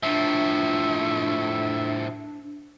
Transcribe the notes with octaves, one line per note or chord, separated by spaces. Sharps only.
A2 F3 D4 E5